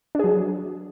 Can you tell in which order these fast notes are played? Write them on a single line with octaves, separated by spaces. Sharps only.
D4 G#4 F#3